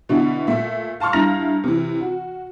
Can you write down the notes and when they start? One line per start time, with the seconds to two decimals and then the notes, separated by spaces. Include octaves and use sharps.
0.09 B2 D3 B3 E4
0.47 A#2 A3 E5
1.00 F5 A5 C6 C#6 F6
1.13 G2 E4 F5 A#5 A#6 F7
1.64 C3 E3
2.01 F#4